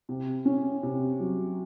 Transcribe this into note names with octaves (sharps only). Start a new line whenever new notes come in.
C3
C#4
C3
F#3